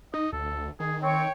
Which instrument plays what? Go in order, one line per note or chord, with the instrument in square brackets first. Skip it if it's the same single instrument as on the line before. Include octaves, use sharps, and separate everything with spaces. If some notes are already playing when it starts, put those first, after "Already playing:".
[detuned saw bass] D#4 [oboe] D#5
[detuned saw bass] D2 [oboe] A4
[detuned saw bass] D#3 [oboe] G#4
[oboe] C4 [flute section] C#5 G5